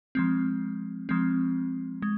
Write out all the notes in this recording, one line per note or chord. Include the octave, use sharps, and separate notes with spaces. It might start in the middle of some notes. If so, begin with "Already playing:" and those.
F3 G#3 C4
F3 G#3 C4
G#3